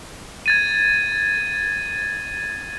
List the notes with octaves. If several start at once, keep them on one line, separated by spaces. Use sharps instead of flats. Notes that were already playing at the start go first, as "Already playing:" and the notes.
G#6 A6 D#7